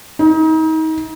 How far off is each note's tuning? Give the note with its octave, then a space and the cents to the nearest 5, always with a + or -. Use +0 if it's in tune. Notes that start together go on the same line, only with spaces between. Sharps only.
D#4 +35